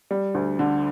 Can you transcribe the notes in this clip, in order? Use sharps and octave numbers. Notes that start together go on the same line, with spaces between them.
G3
D2
D3